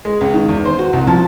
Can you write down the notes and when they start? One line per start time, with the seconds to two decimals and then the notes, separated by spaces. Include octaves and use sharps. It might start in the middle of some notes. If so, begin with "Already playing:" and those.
0.05 G#3
0.21 C#2
0.34 D#3
0.49 E2
0.66 C5
0.79 F#4
0.93 C2
1.07 F3